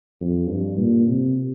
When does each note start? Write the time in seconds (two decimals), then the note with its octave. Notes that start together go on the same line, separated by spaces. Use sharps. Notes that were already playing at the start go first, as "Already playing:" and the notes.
0.21 F2
0.48 G2
0.78 A#2
1.07 C3